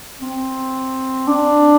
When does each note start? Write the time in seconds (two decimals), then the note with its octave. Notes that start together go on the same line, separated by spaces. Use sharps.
0.21 C4
1.28 D4